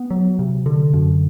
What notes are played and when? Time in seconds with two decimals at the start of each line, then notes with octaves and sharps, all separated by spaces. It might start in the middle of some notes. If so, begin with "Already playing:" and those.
Already playing: B3
0.11 F#3
0.39 C3
0.66 D3
0.93 F#2